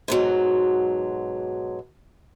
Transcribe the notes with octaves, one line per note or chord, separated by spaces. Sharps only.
G#2 B2 F#3